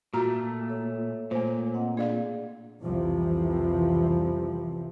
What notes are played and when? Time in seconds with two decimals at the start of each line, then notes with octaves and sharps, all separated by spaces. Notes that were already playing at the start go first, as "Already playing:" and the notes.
0.13 A#2 A3 F4 F#4 A#5
0.68 A4 C#5
1.31 A#2 A3 C5
1.74 C4 D#5 F#5
1.97 D4 G#4 D5 F5
2.82 C2 F2 C3 E3 F3